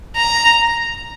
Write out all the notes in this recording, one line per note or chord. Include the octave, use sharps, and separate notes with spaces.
A#5